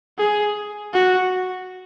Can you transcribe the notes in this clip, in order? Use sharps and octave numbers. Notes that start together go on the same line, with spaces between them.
G#4
F#4